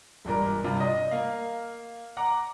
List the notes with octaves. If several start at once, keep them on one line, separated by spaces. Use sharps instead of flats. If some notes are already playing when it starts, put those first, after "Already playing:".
E1 G2 A#2 A#4
G2 C3 F4
D#5
A#3 F5
F#5 A#5 D6